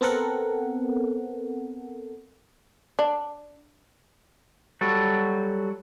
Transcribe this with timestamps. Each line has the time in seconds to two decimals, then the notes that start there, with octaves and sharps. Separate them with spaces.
0.01 B3 C4 A4 A#4 F#5
2.99 D4
4.81 F#3 G3 F#4 A4